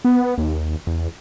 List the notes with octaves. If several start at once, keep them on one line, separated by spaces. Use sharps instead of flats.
B3
D#2
E2